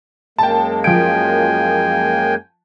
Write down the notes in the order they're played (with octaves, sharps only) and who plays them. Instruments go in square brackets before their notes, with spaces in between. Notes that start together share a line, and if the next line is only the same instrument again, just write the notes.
[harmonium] F#2 G#3 A#3 [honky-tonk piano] G5 A5
[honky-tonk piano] F3 D7 [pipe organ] G5 G#5